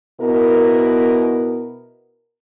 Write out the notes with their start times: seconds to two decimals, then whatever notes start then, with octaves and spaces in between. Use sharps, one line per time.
0.21 B2 B3 E4 A#4